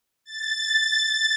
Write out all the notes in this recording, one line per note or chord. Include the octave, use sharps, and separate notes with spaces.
A6